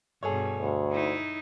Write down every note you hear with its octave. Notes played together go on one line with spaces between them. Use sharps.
G2 B2 G#4 A4 C#5
D2
D#4 E4